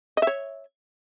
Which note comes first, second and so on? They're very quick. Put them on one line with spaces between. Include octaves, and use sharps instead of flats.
D#5 E5 C#5